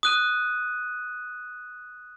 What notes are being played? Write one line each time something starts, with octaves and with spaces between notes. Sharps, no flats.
D#6 F#6 D#7